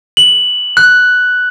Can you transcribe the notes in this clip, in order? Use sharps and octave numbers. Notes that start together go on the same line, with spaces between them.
F#7
F#6